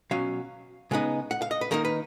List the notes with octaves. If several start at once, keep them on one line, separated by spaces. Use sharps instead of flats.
B2 F#3 C#4 F5
C#3 G#3 B3 D#4
F#5
F5
D#5
B4
D#3 A#3 D#4 A#4
B4